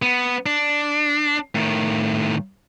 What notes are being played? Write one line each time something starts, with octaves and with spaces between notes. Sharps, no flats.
B3
D4
A2 D#3